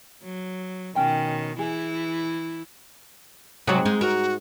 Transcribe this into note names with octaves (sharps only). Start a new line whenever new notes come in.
F#3
B2 D#3 C#4 G5 G#5
E3 E4 G#4
G#2 C3 F#3 G#4 F#5
G#3 D#4
F#4 A#4